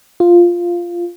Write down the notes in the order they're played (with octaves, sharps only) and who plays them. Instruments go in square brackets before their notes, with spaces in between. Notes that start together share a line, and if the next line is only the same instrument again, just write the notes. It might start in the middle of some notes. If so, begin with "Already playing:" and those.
[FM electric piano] F4